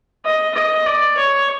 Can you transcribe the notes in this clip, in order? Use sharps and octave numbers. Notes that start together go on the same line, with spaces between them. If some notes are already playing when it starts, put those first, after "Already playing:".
D#5
D#5
D5
C#5